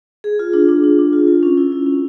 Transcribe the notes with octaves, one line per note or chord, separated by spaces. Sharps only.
G#4
F4
D4
D4
D4
D4
F4
F4
C#4
E4
E4
C#4